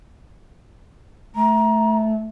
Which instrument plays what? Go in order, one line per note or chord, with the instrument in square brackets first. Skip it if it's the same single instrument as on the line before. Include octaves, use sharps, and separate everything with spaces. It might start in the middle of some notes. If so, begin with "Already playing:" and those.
[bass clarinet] A3 [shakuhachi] A#5